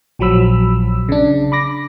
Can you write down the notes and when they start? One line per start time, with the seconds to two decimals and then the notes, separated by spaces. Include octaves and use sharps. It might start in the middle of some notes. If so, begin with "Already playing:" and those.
0.19 A#1 F3 F#3 B5 E6
1.09 C#3 D4
1.52 B5 D6 A#6